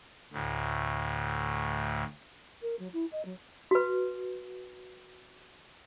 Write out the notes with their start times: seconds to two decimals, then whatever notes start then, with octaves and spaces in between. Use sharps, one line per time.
0.33 D2 A2
2.62 A#4
2.79 F#3
2.93 E4
3.11 D#5
3.25 F#3
3.71 F#4 B4